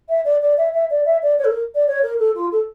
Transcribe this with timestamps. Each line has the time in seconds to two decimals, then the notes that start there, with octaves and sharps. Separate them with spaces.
0.09 E5
0.25 D5
0.42 D5
0.58 E5
0.73 E5
0.90 D5
1.06 E5
1.23 D5
1.39 C#5
1.44 A4
1.50 A#4
1.75 D5
1.87 C#5
2.03 A#4
2.19 A4
2.35 F4
2.52 A4